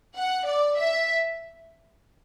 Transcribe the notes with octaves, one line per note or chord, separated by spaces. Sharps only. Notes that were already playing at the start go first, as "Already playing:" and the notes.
F#5
D5
E5